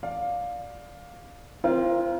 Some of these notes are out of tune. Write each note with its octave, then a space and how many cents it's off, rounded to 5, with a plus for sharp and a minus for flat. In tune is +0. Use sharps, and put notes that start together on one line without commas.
D5 +0 F5 +15
C4 +0 F4 -30 A#4 +25